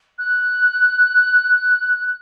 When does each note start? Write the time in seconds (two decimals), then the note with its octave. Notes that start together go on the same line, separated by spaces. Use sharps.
0.18 F#6